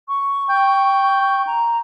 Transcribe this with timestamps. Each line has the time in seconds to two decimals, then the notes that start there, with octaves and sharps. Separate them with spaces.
0.08 C#6
0.49 G5
1.47 A#5